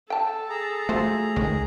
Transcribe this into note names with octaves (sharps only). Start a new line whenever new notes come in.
A4 G5 A5
G#4 A#5
A3 F4 F#4 C5
C#2 D#3 G#3